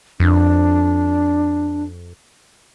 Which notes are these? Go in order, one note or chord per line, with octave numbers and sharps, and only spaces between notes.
F2 D4